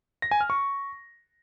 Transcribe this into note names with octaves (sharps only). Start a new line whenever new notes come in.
A#6
G#5
F6
C#6